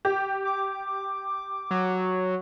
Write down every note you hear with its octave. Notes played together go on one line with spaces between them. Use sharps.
G4
D6
F#3